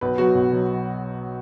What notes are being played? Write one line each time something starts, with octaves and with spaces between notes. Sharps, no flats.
B1 B4
B2 F#3 F#4
B1
B2 F#3